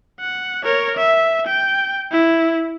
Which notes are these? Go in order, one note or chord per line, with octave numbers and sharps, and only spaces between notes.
F#5
A#4 C#5
E5
G5
E4